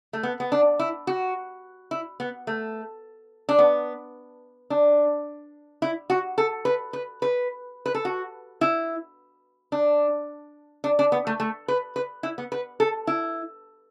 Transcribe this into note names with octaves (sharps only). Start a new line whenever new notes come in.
A3
B3
B3
D4
E4
F#4
E4
B3
A3
D4
B3
D4
E4
F#4
A4
B4
B4
B4
B4
A4
F#4
E4
D4
D4
D4
B3
A3
A3
B4
B4
E4
B3
B4
A4
E4